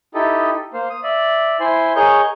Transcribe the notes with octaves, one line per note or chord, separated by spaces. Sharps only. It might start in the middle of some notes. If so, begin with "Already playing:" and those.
D#4 E4 G4 A4 D#5
A#3 C5 F5
D#6
D5 E5
E4 C5 G#5 C6
G#4 A#4 C#5 D#5 C#6 G6